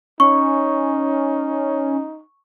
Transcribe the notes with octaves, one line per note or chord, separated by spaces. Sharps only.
C#4 D#4 C#6